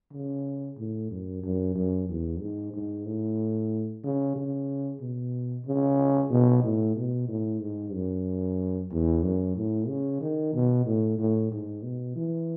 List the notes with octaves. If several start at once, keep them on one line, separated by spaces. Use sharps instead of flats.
C#3
A2
F#2
F#2
F#2
E2
G#2
G#2
A2
C#3
C#3
B2
C#3
B2
A2
B2
A2
G#2
F#2
E2
F#2
A2
C#3
D#3
B2
A2
A2
G#2
B2
E3